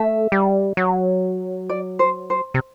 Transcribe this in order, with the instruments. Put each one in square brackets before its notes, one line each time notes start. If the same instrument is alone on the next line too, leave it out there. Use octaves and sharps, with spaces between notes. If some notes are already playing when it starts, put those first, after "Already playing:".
Already playing: [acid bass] A3 [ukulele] E5
[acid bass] G3
F#3
[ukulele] D5
C5
C5
[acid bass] C3